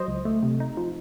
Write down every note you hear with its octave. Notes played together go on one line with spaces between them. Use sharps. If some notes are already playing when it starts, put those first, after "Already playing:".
Already playing: F#3 C5 D#5
C#2
A3
C3
D#4
F3